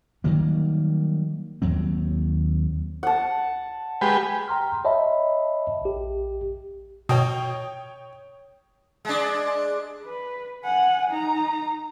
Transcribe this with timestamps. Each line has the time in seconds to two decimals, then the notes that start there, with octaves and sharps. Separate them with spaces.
0.24 D#3 F#3 G3 A#3
1.62 D#2 F#3 C4
3.03 F#5 A5
4.01 G#3 G4 B4
4.48 G5 A#5 C6 F6
4.85 C#5 D#5 E5 A5 B5
5.82 A#1 G4
7.09 B2 C#5 G5 D#6
9.05 G#3 D4
10.05 B4
10.64 F#5 G#5
11.10 D#4 A#5